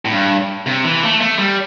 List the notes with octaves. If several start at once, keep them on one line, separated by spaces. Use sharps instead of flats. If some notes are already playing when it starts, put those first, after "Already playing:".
A2
G2
C3
E3
A3
A3
G3